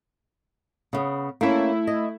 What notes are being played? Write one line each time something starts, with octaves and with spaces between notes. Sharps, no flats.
C#3 B3
A3 A#3 C#4 E4
D#5